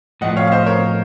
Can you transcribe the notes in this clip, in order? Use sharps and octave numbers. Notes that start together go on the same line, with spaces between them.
A2 F3 A3 D#5 F#5
C#5 F5
F5
C5 D#5
A#4 C#5